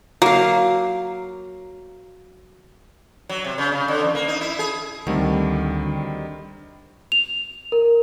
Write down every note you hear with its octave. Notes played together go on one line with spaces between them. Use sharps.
F#3 A#3 F5
F#3
C3
C#3
C#3
D3
E2
A#3
D#4
E4
G#4
D2 D#3 G3 C4
F7
A#4